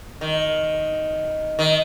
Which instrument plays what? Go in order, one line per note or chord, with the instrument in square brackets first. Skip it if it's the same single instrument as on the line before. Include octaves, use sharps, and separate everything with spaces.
[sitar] D#3
D#3